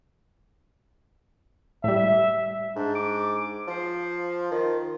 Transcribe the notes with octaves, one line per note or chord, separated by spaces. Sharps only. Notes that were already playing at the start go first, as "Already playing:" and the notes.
A2 G3 E5
G#2 D4
D6
F3 C5
D#3 F4